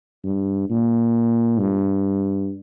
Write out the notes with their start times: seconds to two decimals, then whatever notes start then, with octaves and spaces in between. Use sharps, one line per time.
0.24 G2
0.69 A#2
1.59 G2